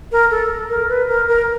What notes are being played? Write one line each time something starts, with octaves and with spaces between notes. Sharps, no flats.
A#4
A4
A#4
B4
A#4
A#4